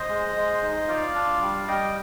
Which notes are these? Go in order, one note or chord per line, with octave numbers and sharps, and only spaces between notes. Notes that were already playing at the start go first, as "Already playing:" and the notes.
Already playing: C5 D#5
G#3
G#3
D#4
F4 D5 F5
D4
G3
G3 D#5 G5